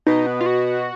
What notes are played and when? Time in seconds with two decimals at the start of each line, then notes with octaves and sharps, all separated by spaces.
0.07 B2 D#4
0.26 B3
0.41 F4
0.46 F#4